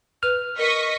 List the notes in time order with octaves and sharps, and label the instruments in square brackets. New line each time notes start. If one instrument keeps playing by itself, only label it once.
[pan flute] B4 [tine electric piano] F6
[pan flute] A#4 [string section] D#5 C#6 B6